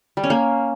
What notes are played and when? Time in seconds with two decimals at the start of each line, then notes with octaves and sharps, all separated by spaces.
0.17 G3
0.24 C#4
0.30 A#3